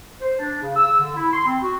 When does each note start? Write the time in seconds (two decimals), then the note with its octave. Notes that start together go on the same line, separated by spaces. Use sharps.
0.21 C5
0.39 D4
0.62 C#3
0.76 E6
0.99 D3
1.16 E4
1.33 C6
1.45 C4
1.62 F#4